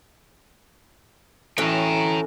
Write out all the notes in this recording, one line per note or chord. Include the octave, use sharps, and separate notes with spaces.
A2 E3 C#4 F#4 G5 A#5